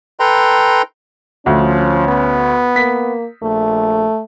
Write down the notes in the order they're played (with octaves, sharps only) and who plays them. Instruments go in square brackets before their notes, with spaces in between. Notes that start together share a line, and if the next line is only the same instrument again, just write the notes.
[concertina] A4 B4 G5 A#5 C6
[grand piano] D2 [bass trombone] F3 [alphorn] C#4
[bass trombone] B3
[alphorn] A#3 [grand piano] B6
[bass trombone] A#1 [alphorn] A3